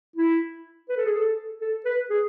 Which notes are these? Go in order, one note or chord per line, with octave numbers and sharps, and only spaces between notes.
E4
B4
A4
G#4
A4
A4
B4
G#4